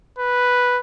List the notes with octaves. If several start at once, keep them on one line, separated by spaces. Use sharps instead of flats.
B4